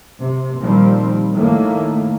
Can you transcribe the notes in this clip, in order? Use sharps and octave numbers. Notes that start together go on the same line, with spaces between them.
C3
A#2 D#3 F3 G3 C4
A2 D#3 A3 A#3